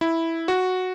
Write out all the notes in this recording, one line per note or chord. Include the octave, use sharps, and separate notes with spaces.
E4
F#4